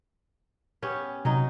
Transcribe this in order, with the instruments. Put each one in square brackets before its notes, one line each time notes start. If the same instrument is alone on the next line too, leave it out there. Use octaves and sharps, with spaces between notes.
[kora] B3 C#4 G4
[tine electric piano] C3 [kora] F#3 D#4